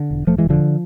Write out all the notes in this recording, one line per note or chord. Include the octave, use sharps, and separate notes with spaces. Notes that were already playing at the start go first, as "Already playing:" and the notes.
Already playing: D3
E1
E1 F3 A3
E3 G#3
E1
D3 F3